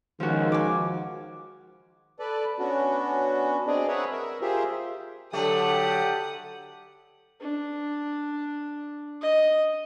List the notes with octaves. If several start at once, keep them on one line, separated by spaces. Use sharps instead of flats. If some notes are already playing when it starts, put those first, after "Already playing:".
C#2 D#3 F3 F#4
G#5 D6
A4 B4 D5
B3 C#4 D4 F#4
C4 D4 G#4 D5 D#5
G#4 A#4 B4 C#5 E5 F#5
A#4 E5
F4 G4 G#4 A#4 C5 E5
D3 F#3 A3 G4 F#5 D#6
D4
D#5